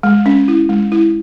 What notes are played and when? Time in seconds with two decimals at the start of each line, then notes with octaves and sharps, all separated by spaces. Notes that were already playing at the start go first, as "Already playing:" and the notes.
0.03 G#3
0.26 C#4
0.48 E4
0.69 G#3
0.92 E4